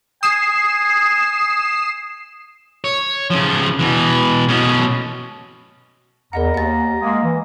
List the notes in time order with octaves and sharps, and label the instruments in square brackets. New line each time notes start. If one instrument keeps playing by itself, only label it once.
[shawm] G#5 [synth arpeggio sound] D#6 C7 E7
[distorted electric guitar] C#5
C#3 F3
B2 E3
B2 C#4
[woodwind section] E2 [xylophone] A#4 D#5 F#5 [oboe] A#5
[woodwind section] D#2 [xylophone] F#5 A6
[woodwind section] G#3 A#3
E3